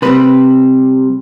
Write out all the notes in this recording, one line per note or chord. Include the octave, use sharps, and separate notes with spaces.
C3 G3 C4 B4